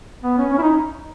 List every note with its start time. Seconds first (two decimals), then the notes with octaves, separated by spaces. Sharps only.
0.23 B3
0.38 C#4
0.52 C#4
0.58 E4
0.62 D#4